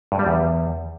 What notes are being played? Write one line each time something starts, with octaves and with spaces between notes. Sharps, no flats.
G2
G3
E2